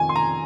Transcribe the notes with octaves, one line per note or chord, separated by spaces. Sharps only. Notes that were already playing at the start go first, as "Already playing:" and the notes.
Already playing: F2 D#3 G#5
C6
A#5